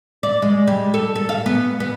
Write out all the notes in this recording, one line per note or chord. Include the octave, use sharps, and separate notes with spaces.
D5
G#3
G3
A4
A4
F5
B3
B3